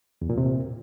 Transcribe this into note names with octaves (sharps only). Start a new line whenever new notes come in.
E2
A#2
C3